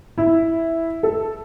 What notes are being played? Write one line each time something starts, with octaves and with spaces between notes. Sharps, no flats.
E4
A4